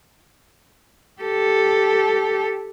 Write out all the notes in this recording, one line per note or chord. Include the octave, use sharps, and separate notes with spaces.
G4 A4